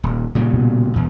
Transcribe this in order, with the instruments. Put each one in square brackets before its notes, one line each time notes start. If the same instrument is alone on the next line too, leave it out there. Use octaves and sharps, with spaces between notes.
[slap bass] D#1
A#2 C#3 G3
[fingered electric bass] B2
[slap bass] E2 B2